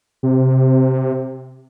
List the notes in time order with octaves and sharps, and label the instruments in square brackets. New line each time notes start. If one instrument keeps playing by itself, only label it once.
[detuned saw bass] C3